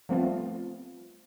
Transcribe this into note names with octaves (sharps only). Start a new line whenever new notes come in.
F3 G3 A3 B3 C4 F4